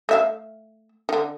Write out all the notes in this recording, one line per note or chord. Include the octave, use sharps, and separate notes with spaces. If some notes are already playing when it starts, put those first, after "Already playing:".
A3 E5 F5
D3 D#3